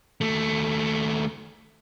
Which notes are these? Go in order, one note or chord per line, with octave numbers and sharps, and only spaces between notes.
D#2 A3